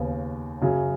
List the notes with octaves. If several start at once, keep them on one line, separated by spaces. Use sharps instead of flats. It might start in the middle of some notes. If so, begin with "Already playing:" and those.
Already playing: D#2 C#3 B3
F#2 C#3 F#3 C#4 G#4